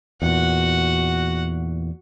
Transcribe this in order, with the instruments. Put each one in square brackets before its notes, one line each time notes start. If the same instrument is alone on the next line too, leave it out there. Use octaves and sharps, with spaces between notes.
[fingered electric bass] E2 A#2 [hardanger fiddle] F#4 F#5